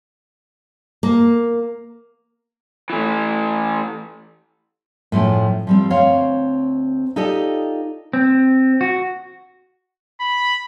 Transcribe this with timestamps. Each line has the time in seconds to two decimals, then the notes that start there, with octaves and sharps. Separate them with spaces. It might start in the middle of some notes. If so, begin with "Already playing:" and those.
1.03 A#3
2.90 E3 A3
5.12 A2 F3 A3 C#4
5.67 F3 G3 C4
5.90 D2 C4 C#5 F5
7.16 D#4 F4 G4 A4 D5 D#5
8.13 C4
8.81 F#4
10.20 B5